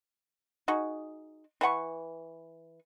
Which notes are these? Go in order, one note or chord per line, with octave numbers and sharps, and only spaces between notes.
D#4 F#4 G#4
E3 B4 F#5 C#6